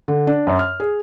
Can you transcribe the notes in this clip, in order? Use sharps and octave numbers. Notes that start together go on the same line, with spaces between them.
D3
D4
F#2
F6
G#4